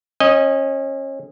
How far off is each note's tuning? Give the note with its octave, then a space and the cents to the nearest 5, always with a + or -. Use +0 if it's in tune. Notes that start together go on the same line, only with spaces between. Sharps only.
C#4 -30 D#5 +0